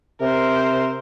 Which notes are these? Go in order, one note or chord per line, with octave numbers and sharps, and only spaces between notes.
C3 A#4 C5